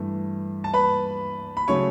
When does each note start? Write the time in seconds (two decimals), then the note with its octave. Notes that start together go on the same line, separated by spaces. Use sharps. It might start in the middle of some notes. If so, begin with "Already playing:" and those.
Already playing: G2 E3 A3
0.64 A5
0.74 B4 B5
1.57 B5
1.68 C#3 F#3 A3 C#5 C#6